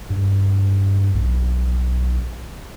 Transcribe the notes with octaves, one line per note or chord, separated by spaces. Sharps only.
G2
B1